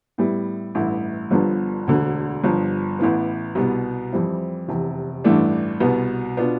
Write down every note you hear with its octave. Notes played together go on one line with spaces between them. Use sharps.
A2 G3 B3 E4
A1 G2 E3 A3 E4
G1 G2 D3 F3 B3
E1 D2 D3
G1 G2 F3
A1 A2 E3 B3
C2 B2 G3 B3
F2 E3 G3 C4 E4
F1 E2 C3
A1 G2 E3 A3 D4
C2 B2 B3
B2 B3 D4 F4